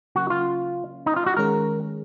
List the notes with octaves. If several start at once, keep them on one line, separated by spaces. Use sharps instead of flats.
C#3 F#3 A#3 C#4 F#4
F4
D#4
F4
F#4
D#3 G#3 C#4 G#4 A#4